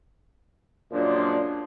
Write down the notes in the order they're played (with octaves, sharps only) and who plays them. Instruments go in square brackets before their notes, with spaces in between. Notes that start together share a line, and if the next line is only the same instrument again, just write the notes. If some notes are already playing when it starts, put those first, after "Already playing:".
[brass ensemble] F#2 A#2 F3 G#3 D4